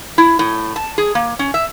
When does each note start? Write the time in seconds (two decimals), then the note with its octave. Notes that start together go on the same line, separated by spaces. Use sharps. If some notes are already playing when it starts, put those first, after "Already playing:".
0.18 E4
0.39 A2
0.76 A5
0.98 G#4
1.15 A#3
1.39 C#4
1.54 E5